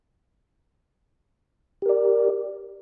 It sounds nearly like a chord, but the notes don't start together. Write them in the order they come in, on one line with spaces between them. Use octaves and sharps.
G4 A#4 D5